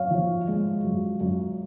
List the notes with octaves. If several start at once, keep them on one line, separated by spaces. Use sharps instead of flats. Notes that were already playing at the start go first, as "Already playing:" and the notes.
Already playing: F#2 C#5 F5
F3
G#3
F#2
F#2